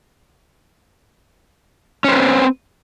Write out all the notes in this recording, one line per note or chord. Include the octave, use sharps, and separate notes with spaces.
C4 C#4 B4 C5